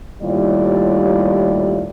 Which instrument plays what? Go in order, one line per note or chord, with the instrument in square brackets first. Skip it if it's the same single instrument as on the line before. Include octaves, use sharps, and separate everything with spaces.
[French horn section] D#2 A2 G3 E4 F4 D5